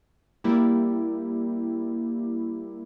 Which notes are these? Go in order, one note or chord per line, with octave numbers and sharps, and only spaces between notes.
G3 A#3 E4 G4